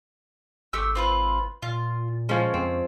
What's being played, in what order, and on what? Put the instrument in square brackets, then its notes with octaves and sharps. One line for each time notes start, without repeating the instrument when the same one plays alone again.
[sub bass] G#1 [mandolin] A3 G4 E6
[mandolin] C4 F4 B4
[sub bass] A#2 [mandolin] F4
[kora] C#3 F3 G#3 [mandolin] C#4
[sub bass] F2 [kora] C4